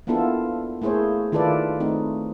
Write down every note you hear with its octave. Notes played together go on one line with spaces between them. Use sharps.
A#3 B3 D4 E4 F4 A4
A3 A#3 E4 G#4 C5 C#5
D#3 E4 F4 A4 B4 D5
A3 C4 D#4